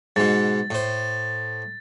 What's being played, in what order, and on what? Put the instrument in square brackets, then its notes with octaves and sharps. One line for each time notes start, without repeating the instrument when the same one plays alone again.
[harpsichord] G#2 B2 [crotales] A6
[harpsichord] A2 C5